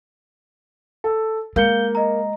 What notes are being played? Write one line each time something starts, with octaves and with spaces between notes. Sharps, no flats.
A4
G#3 A#3 F5 G6 C#7 G7
D#5 A#5